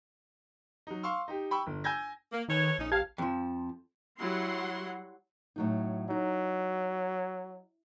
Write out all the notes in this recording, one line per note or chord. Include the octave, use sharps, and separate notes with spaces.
F#3 D#4
F5 C6 C#6 E6
D#4 G4
G5 B5 C#6 E6
G1
G#5 E6 G6 G#6 A#6
A#3
D#3 A4 B4 C#5
A#1 C#4 D#4
F3 G4 B4 F5 A5 G#6
F2 F3
F#3 G3 E4 F#5 C6
A2 F#3 D#4
F#3 D#4